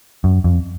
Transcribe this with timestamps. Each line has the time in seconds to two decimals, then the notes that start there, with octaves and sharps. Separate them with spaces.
0.24 F#2
0.44 F2